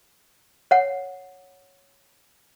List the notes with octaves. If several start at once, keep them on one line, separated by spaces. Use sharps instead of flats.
C#5 F#5